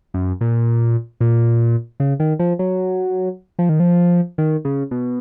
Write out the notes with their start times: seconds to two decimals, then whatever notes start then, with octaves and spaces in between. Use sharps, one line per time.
0.14 F#2
0.41 A#2
1.21 A#2
2.00 C#3
2.20 D#3
2.39 F3
2.59 F#3
3.59 F3
3.69 D#3
3.80 F3
4.38 D#3
4.65 C#3
4.91 B2